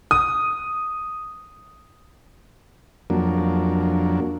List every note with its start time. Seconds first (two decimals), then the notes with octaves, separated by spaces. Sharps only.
0.11 D#6
3.10 F2 F#3 A#3 D4